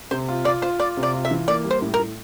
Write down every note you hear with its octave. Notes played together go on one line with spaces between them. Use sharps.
C3 C5
F4
F4 D5
F4 C5
F4 D5
C3
D5
F4
E5
E3
A#3 D5
G3
C5
A2
A#4
A2